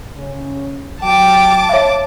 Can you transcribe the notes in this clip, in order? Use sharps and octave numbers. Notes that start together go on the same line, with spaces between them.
C#3 C#4
F#3 G5 A5 D6
C#5 E5 F5